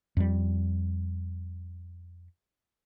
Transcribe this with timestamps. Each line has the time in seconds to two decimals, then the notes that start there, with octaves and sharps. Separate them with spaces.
0.17 F2 G3